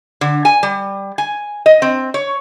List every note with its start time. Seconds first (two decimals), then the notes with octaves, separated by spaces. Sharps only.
0.21 D3
0.45 G#5
0.63 G3
1.18 G#5
1.66 D#5
1.82 C4
2.14 C#5